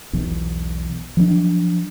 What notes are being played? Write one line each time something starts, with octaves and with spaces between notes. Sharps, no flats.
B1 E2
F3 F#3 A#3 D4